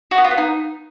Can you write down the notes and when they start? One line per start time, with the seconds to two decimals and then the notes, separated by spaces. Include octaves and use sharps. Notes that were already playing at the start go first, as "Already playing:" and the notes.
0.11 F#4
0.18 B3
0.24 F4
0.31 B3
0.38 D#4